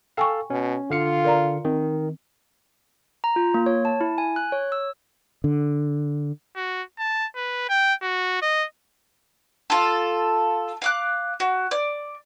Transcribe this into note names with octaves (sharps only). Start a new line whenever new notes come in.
A4 F5 G5 G#5 C#6
B2 C#4
D3 F4 F5 C#7
A#4 D5 A#5
D#3 C4
A#5
F4
A#3
C#5
A5
E4
G#5
F#6
C#5
E6
D3
F#4
A5
B4
G5
F#4
D#5
F4 A4
F5 D6 F#6
F#4
D5